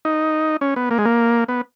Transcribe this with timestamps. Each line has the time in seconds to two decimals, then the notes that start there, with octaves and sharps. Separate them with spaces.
0.05 D#4
0.61 C#4
0.76 B3
0.91 A#3
0.98 G#3
1.05 A#3
1.48 B3